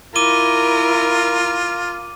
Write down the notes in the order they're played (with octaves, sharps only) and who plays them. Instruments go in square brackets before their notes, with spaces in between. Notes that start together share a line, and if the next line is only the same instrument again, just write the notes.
[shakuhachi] E4 [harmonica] F4 [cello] A#4 [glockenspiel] D6 D#7 G7